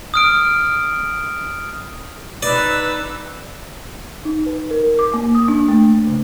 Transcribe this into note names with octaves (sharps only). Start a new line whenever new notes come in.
D#6 F6 D7
D#4 B4 D5 E6
D#4
B4
A#4
D6
A#3
D#6
D4
A3
C#3